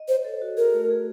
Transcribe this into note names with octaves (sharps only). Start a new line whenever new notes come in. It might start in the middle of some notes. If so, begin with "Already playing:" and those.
Already playing: D#5
C5 C#5
A4
F#4
G#4 A#4
A3
G#4